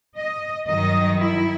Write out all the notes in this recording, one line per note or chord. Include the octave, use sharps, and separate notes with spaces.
D#5
G2 D#3 F#3 D#5
E4